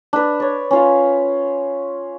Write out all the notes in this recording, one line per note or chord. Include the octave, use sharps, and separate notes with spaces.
D4 B4
C#5 D5
C#4 F4 F5